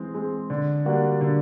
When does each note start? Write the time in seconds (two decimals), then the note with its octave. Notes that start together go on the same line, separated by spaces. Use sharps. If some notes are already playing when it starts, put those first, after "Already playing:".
Already playing: E3 G#3 C4
0.14 G#3 C4
0.50 D3
0.85 G3 A#3 D4 F#4
1.21 D3